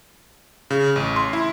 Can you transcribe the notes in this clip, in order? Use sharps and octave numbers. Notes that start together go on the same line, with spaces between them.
C#3
A1
C6
E4